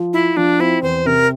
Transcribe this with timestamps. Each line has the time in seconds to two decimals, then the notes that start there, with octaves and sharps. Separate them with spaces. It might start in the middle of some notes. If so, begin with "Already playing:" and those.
Already playing: F3
0.13 E4 F4
0.37 F3 D4
0.59 C4 E4
0.82 E2 C5
1.05 C3 A#4